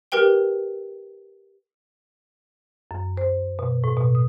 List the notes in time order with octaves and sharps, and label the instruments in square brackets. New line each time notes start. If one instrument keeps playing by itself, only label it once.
[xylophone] G4 A#4 B4 G5 G7
[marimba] F#2
C5
B2
A2
B2
D#6